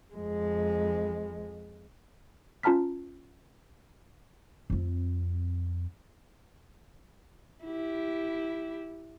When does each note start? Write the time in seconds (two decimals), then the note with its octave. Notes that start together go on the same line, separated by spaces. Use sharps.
0.14 F2 G#3
2.63 C#4 F4 A5 A#5 F6 B6
4.70 F2 C4
7.65 E4 G4